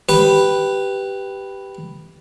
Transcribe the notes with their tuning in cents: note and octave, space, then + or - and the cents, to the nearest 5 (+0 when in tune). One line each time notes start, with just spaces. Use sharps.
G4 -5 B4 +0